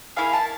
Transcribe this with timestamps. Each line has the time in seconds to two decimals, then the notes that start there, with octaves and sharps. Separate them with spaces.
0.16 A#3 C#4 E4 G#4 F5
0.33 A5